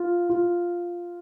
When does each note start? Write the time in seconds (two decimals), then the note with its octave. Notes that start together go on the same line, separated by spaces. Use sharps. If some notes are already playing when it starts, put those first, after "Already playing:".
Already playing: F4
0.29 F4